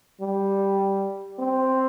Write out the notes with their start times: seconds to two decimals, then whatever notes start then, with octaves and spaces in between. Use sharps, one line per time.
0.21 G3
1.39 C4